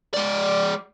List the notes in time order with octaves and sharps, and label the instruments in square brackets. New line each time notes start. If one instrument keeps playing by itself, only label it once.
[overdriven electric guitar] G#3 D5